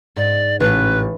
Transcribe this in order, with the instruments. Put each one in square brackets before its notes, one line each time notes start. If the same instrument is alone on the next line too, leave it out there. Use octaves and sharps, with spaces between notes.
[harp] G#2 [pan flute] D5
[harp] A1 [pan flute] B4